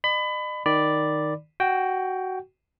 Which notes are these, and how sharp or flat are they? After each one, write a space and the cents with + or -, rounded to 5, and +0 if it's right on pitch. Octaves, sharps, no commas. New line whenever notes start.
D#5 -45 B5 +25
D#3 -5 D5 +0 B5 +0
F#4 +15 G5 +0